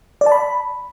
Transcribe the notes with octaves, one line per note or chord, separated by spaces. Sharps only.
D5
A5
B5